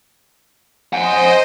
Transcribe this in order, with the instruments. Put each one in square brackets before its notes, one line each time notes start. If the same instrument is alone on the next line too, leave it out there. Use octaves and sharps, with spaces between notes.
[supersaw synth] C5 D#5 [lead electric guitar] F#5 G#5